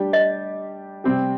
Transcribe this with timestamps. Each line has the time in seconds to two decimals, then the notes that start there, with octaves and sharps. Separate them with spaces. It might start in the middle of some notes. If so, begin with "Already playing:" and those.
Already playing: G3 D4 G4
0.13 D#5
1.04 C3 G3 C4 G4